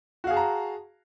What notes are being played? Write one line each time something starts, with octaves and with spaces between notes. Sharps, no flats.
F#4 G#4 F5 A5 A#5